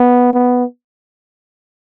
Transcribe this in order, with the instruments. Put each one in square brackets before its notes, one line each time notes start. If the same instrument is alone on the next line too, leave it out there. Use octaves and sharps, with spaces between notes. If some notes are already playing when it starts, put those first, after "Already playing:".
Already playing: [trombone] B3
B3